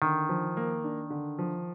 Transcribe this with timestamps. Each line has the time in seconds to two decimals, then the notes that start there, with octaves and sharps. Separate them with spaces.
0.02 D3 D#3
0.29 F3
0.57 A#3
0.84 D4
1.10 D3
1.39 F3